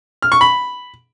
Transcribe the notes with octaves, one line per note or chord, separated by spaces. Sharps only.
F6
C#6
B5